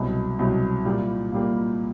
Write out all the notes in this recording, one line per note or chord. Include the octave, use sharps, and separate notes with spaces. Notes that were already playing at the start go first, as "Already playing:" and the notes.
Already playing: C2 B2 F#3
C2 B2 F#3
A#2 G3 A#3
A#2 G3 A#3